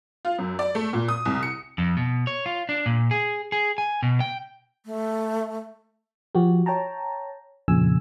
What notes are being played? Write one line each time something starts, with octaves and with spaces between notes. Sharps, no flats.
F4
F#2
D5
A3
A#2
D#6
C2
C#7
F2
B2
C#5
F4
D4
A#2
G#4
G#4
G#5
B2
G5
A3
F3 F#4 G4
C#5 G5 A5 A#5
F2 A#2 C#3 G#5 E6